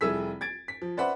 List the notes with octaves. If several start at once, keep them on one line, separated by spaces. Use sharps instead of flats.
F1 G3 E4 G#4 E6 B6
G#6 A6 D7
B6
F3
B4 C5 D5 E5 F#5 B5